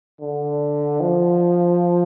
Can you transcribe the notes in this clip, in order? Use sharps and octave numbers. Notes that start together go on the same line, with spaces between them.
D3
F3